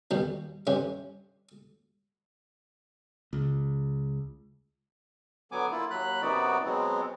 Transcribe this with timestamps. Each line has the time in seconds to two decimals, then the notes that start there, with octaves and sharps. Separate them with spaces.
0.11 D#2 B2 G3
0.67 G2 C3 C#4
3.33 C#2
5.52 D3 F#3 B3 G#5 D6
5.72 A#3 E4 F4
5.91 D#2 F#3 B5 F#6
6.22 F#2 C3 B3 D#4 F#4 D5
6.65 B2 F#3 G#3 B3 C4